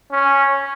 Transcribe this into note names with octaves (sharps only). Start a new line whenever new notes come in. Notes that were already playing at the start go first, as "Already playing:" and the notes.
C#4